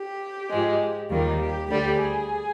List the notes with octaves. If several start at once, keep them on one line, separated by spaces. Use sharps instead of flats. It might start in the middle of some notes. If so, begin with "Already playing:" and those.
Already playing: G4
G#2 F3 G#3
D#2 D#3 G3 A#3 F4
G4
D2 D3 G3 G4
G#4